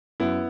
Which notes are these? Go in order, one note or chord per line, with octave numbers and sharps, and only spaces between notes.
F#2 B3 E4